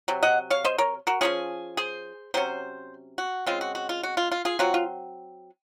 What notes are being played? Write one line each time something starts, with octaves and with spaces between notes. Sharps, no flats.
C3 F#3
D#5 F#5
C#5 F5
C5 D#5
A#4 C#5
F#4 A#4
F3 A#3 C#4 F4 G#4
G#4 C5
C3 F#3 C#4 C5
F#4
C#3 G#3 C4 F4
F#4
F#4
F4
F#4
F4
F4
F4 G#4
F#3 C4 F4 F#4
F4